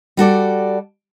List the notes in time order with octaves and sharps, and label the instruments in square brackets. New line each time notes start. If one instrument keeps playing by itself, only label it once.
[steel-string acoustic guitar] G3 F#4 A4 D5